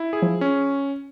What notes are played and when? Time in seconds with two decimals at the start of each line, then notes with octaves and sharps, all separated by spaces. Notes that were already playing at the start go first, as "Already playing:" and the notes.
Already playing: E4
0.13 G#4
0.22 F3
0.41 C#4